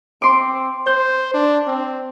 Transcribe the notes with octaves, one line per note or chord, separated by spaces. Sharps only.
C4 C6 D6
C5 G6
D4
C4